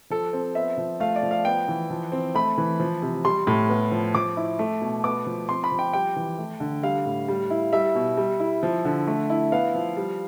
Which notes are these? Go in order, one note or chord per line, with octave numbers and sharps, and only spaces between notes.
F3 A4
C4
B3 E5
F3
A3 F5
D5
F3
F5
B3 G5
E3
F3
C4
A3 B5
E3
F3
C3
G3 C6
A2
B3
F3
F3 D6
E4
A3
B2
B3 D6
F3
C4 C6
B5
F3
G5
G3 G5
E3
A3
D3
G3 F5
A2
G3
E4
G3 E5
B2
G3
E4
F3
D3
A3
E4
B3 F5
F3
G3